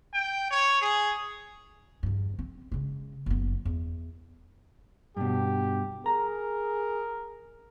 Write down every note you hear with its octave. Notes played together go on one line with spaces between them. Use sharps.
G5
C#5
G#4
E2 G2
C4
C#3 G#3
F#1 B3
E2
G2 B2 G4
G#4 A#4 A#5